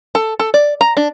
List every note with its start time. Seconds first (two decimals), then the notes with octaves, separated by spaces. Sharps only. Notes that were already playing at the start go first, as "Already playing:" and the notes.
0.15 A4
0.39 A4
0.54 D5
0.81 A#5
0.97 D4